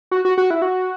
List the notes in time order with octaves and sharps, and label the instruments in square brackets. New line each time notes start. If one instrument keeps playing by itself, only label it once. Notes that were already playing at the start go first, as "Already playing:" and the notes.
[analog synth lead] F#4
F#4
F#4
E4
F#4